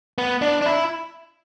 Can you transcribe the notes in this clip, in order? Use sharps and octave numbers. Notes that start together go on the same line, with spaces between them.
B3
D4
D4
E4